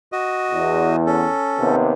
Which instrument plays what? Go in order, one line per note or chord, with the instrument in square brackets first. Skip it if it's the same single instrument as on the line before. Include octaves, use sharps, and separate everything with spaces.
[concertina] F#4 D#5
[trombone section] E2
[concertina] C#4 A4
[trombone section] D#2 C3 B3